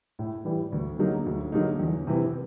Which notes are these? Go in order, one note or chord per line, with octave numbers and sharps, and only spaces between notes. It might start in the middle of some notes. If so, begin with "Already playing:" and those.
A2
E3 G3
D2
D3 F#3 A#3 D#4
D2
D3 F#3 A#3 D#4
E2
C3 E3